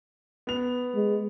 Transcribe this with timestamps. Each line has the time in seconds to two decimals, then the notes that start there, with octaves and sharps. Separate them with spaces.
0.47 B3 F7
0.95 G#3